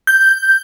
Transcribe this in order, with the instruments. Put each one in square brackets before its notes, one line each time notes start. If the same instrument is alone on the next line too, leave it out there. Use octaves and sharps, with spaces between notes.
[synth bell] G6